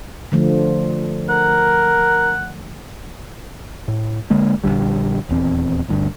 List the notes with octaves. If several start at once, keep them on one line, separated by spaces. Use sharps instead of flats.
D3 F3 A3
A#4 F#5
A2
D3 G#3 A#3
A#1 F2 D3 G3
D#1 E2 C4
G1 D2 G2 D3